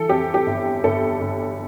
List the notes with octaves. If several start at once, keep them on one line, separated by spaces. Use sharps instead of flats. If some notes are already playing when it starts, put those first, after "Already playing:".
Already playing: E3 A4
F2 G4
G4
G1
G1 A4
G1